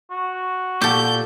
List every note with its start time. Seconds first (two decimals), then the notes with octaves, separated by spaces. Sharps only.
0.11 F#4
0.81 A#2 G4 A4 G6